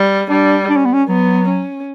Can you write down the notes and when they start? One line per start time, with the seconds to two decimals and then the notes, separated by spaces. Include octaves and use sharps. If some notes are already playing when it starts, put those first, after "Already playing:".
Already playing: G3
0.29 G3 D4
0.69 D4
0.77 C#4
0.85 B3
0.93 C#4
1.09 F#3 B3
1.47 C#4